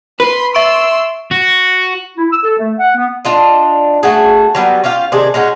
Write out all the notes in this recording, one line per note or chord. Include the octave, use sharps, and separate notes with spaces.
B4 B5 C6
E5 C6 C#6 E6 D7
F#4
E4
E6
A4
A3
F#5
B3
D4 F4 D#5
A3 F#4 G#4
F#3 G3 B3
C#4 F4 G4 F5
C3 D#3 D4 G#4
G#3 C#4 D#4 F#4